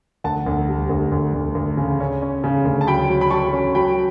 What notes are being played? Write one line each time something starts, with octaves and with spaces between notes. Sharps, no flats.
D2 F#5 A5
D2
G3
D2
D2
D2
D2
C#3
C#4
C#4
C#3
D2
A5
F#3 G5 B5
F#3
B5
F#3 A5 C#6
C#4
F#3 G5 B5